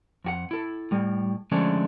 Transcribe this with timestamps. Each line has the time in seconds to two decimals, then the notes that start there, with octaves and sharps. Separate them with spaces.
0.24 F2 F#4 F#5
0.51 E4 A4
0.91 A2 G3
1.52 D3 F3 G#3 A3 C#4 D4